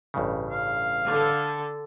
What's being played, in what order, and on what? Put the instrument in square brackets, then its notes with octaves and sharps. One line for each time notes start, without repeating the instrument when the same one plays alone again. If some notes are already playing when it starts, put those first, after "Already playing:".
[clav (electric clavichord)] A1 G2 C#3
[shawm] F5
[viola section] D3 A4